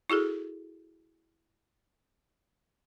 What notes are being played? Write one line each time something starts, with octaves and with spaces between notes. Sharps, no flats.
E4 F#4 G#4 A4